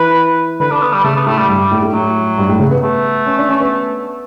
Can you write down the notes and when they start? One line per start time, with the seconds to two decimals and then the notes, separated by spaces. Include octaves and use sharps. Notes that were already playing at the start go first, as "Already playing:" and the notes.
Already playing: E3 B4
0.60 D3 B4
0.71 D4
0.82 B3
0.93 G3
1.04 C#3 A3
1.16 B3
1.26 A2 A3
1.38 G3
1.49 G2 G3
1.72 A2
1.82 A2
1.93 A2 F#3
2.38 G2
2.49 A2
2.60 C#3
2.71 B3
2.82 A3
3.26 C#4
3.38 D4
3.49 C#4
3.60 B3